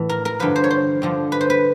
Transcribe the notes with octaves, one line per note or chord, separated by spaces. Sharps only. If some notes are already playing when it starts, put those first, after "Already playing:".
Already playing: A2 E3
A#4
A#4
G2 D3 F3 B4
C5
C#5
C5
G2 D3 F3
B4
C5
B4